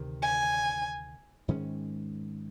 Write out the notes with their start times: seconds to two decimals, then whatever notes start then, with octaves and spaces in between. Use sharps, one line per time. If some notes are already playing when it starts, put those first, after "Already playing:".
Already playing: D2 C3 D#3
0.23 G#5
1.48 G#2 D#3 G#3 C#4